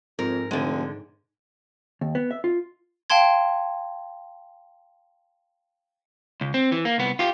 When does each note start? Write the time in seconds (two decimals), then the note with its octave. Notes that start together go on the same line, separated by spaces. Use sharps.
0.19 F2 G#2 A#4
0.51 F1 D3 G#3
2.01 D#2
2.15 B3
2.31 E5
2.44 F4
3.10 F5 G5 A5 C6 G#6
6.41 C#2
6.54 C4
6.72 E3
6.85 A#3
6.98 C2 B3
7.19 F4 G4